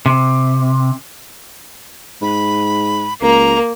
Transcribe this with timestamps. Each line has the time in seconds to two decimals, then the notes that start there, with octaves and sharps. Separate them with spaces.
0.06 C3
2.22 G#2 B5
3.22 C#2 A#3 A#5